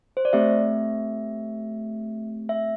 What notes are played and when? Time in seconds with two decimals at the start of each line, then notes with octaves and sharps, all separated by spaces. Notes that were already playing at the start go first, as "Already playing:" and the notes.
0.17 C5
0.25 D5
0.33 A3 C4 G4 E5
2.49 E5